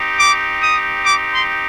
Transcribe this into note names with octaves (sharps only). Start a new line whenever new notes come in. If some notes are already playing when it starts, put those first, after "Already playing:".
Already playing: C4 D#4 G4
D6
D#6
D6
C6